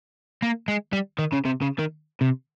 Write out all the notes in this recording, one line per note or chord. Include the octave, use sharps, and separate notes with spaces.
A#3
G#3
G3
D#3
C#3
C3
C#3
D#3
C3